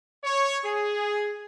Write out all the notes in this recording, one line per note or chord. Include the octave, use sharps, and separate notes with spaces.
C#5
G#4